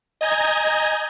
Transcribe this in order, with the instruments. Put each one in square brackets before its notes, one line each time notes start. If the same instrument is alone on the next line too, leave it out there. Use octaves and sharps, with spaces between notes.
[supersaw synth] D#5 G#5 A#5 G6 G#6